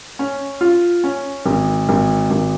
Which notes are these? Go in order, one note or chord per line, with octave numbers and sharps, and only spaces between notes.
C#4
F4
C#4
G#1
G#1
G#1